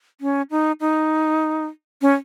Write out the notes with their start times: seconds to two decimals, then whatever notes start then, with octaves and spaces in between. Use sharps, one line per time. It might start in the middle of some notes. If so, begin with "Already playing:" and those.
0.21 C#4
0.51 D#4
0.80 D#4
2.02 C#4